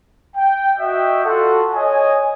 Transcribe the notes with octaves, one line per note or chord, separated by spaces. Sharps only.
G5
F#4 D#5 E5 G5
F4 F#4 A4
C#5 D#5 G#5